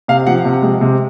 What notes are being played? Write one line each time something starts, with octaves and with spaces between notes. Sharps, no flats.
C3 F5
F3 F#5
C3
G#3
C3